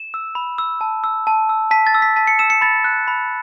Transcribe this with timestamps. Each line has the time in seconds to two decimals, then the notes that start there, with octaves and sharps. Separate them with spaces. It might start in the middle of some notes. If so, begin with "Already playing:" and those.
Already playing: E7
0.14 E6
0.35 B5
0.58 E6
0.81 A5
1.04 E6
1.27 A5
1.49 E6
1.71 A5 B6
1.87 A6
1.95 E6
2.02 B6
2.16 A5 B6
2.27 C#7
2.39 E6 E7
2.50 C#7
2.61 B5 A6
2.84 F#6
3.08 B5